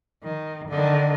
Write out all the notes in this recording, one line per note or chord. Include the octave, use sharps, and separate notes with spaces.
D#3
D3 D#3